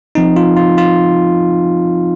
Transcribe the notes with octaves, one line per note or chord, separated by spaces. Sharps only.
F3 C4 D#4
F4
F4
F4